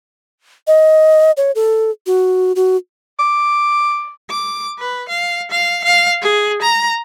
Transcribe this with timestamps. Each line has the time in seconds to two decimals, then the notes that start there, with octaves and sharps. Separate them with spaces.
0.67 D#5
1.37 C#5
1.55 A4
2.06 F#4
2.56 F#4
3.19 D6
4.30 D6
4.78 B4
5.08 F5
5.51 F5
5.84 F5
6.22 G#4
6.62 A#5